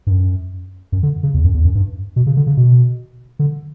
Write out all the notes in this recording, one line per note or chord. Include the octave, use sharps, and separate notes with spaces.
G2
F#2
F#2
D3
C#3
E2
F#2
E2
F#2
G2
B2
C#3
D3
C#3
B2
D3